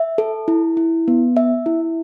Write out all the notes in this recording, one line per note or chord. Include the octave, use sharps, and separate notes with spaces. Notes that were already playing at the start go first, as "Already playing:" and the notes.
Already playing: E5
A4
E4
E4
B3
E5
E4